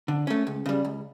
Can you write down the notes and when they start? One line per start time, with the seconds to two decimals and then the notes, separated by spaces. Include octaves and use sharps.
0.08 D3
0.27 A3 C#4
0.47 C#2
0.66 C#3 G3
0.85 C#2